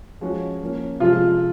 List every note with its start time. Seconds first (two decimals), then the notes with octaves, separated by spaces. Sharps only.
0.21 F3 G#3 C#4 F#4
0.61 F3 A#3 C#4
1.00 C3 F3 G#3 F4